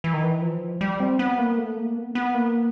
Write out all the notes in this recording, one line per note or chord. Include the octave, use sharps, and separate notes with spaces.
E3
D#3
E3
F3
G3
C4
B3
A#3
A3
A#3
B3
B3
A#3